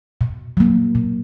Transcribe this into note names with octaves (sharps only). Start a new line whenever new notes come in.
B2
F#3 A#3
B2